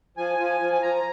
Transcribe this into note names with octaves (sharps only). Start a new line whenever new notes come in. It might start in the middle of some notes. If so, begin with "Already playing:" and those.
F3 G#5
F3
F3
G#5
F3 A#5